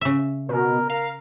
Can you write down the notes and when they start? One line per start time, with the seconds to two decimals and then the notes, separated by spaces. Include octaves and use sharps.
0.01 C#3 E5
0.49 B2 A#4
0.89 A#4 F5